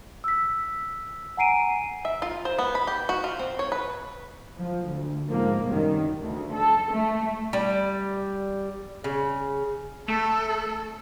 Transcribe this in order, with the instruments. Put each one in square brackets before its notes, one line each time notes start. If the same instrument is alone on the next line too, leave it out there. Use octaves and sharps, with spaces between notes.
[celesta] E6 B6
F#5 G#5 A#5 C7 D7 D#7
[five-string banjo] E5
F4
C5
B3
B5
G4
F#4
F4
C4
C#5
B4
[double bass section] F3
D2
G#2 F3 A#3
F#2 C3 D#3 G3
[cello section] D2
A4
A3
[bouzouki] G3
C#3
[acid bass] A3 [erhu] A4